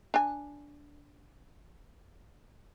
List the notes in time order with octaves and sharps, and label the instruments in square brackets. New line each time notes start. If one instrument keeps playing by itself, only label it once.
[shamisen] D4 G#5